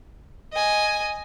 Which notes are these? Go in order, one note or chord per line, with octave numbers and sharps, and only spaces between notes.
D#5 G#5